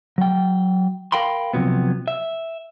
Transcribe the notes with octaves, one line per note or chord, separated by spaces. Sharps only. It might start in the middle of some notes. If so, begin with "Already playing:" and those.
F#3 G5
A#4 F5 G5 B5 C6
C3 F3 F#3 B3
E5